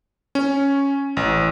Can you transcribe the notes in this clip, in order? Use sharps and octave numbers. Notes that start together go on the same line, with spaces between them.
C#4
A1